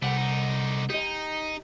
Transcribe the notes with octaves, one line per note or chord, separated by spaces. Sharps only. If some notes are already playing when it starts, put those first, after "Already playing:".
C2 A3 G4 F#5
D3 D#4
D#4 G4 D#5